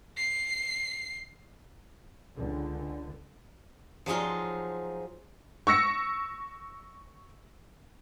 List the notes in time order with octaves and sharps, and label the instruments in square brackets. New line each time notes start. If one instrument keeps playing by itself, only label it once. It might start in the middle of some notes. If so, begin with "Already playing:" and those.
[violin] C7
[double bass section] C#2 D3
[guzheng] F3 F#3 G#3 D#4 F4
[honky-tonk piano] C#6 E6 A#6 C#7